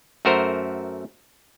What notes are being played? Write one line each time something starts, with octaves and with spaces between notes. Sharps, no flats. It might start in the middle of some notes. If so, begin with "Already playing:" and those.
F#2 A3 F#4 A#4 C5